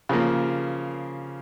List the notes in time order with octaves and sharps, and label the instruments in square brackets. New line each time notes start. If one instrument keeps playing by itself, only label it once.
[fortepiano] C#3 F3 A#3